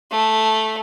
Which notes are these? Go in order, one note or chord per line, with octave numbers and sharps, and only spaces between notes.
A3